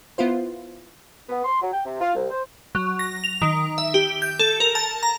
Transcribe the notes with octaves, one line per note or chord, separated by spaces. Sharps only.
B3 E4 F4 C5
B3
C6
F#3
G5
C3
F4
C2
C5
F#3
A#6
F7
D#3
E5
G4
G6
A4
A#4
A5
A#5